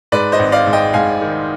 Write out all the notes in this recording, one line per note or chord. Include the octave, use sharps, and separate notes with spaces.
G#2 B4 D5
C5 D#5
G#1
D5 F5
G#2
D#5 G5
G#2 F5 G#5
D#3